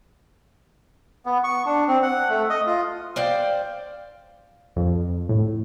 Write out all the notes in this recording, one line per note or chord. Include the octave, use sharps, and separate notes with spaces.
B3
C#6
D4
C4
F#5
A3
D#5
F4
C5 D5 F5 G5
F2
A2